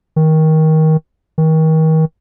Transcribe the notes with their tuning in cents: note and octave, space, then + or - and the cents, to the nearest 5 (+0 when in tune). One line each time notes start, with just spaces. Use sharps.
D#3 +20
D#3 +35